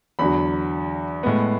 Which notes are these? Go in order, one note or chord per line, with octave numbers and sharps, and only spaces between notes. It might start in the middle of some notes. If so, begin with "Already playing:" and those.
E2 D3 F#3 B5
A2 G#3 B3